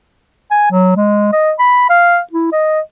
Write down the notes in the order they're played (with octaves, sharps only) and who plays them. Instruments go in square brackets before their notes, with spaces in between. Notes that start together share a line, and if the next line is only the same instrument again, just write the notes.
[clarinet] G#5
F#3
G#3
D#5
B5
F5
E4
D#5